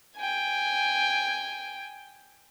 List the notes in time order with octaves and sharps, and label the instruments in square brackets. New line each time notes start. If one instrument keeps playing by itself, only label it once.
[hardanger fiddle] G5 G#5